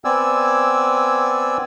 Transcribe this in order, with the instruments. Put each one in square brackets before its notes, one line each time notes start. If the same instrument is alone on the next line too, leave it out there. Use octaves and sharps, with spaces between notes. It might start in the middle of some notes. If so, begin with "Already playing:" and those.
[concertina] B3 C4 D5 G#5 E6